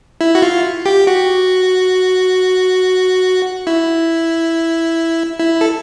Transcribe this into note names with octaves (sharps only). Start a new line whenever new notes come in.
E4
F#4
F4
G4
F#4
E4
E4
A4